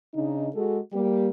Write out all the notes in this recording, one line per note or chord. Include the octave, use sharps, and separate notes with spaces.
C#3 D4 D#4
G#3 F#4 G#4 A4
G3 A#3 G4